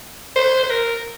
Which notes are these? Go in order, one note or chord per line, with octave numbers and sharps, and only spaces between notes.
C5
C5
A#4